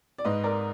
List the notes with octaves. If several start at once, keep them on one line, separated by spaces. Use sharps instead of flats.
D5
G#2 B4 D#5
A#4 D5